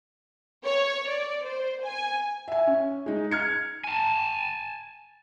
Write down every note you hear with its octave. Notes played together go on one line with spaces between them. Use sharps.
C#5
D5
C5
G#5
E5 G#5
C#4
G#3 D#4
F6 G#6 C#7
G#5 A5